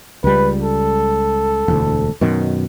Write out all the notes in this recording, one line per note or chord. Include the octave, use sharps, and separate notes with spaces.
C#2 G3 B4
A4
E1 D2
F#2 B2 D#3